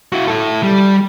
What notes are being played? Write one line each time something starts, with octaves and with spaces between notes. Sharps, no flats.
E4 F#4
E4 A4
G3